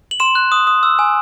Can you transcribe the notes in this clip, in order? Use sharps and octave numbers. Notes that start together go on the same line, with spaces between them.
F#7
C6 E7
F#6
D#6
D#6
E6
G#5